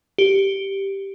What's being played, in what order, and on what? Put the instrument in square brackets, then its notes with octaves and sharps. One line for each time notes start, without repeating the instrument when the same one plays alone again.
[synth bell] G4